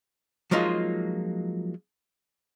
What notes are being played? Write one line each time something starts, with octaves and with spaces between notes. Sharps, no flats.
F3 F#3 G#3 A#3 D#4 F4